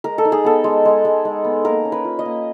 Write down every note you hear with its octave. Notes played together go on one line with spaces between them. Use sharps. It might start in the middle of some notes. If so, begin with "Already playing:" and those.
G#3 A#4
A4
D#4
G#4
B3 A4
G#3
G#3
G#3
G#3
B3
A#3 A#4
C#4
B4
F4
D#5
A#3